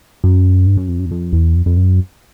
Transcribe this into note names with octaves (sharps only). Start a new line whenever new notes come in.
F#2
G2
F#2
F2
F#2
E2
F2
E2
F2
F2
F#2